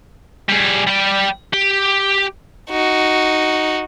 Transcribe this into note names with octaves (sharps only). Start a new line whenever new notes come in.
G3 G#4
G3 G5
G4
D#4 F#4